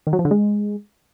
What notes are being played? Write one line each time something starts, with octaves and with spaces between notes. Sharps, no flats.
D#3
F#3
F3
D3
G#3